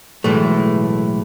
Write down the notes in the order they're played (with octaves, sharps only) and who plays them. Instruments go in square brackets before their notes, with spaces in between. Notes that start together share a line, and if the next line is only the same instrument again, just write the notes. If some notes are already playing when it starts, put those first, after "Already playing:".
[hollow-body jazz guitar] B1 A2 E3 G#3 A3